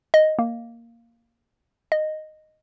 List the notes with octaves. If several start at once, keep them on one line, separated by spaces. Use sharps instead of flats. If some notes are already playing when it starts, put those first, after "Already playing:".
D#5
A#3
D#5